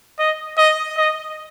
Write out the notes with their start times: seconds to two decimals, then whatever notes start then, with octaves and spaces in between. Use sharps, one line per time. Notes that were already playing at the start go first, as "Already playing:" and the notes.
0.19 D#5
0.58 D#5
0.97 D#5